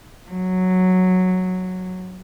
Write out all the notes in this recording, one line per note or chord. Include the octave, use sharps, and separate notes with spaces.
F#3